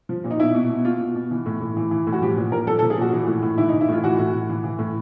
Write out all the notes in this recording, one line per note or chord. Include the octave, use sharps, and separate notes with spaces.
F3
A#2
D#4
B2 E4
B2
B2
B2 F4
B2
B2
E3
A2
A2
E3
E3
A2
F#4
F3 G4
A#2
A#2 A#4
F3 A4
A4
F3
G#4
A#2 F#4
E3
A2
A2
E3 E4
D#4
E3
E4
A2 F4
E3 F#4
A2
A2
E3
E3
A2